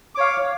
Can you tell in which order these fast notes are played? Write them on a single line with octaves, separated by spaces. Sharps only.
D6 C#5 F5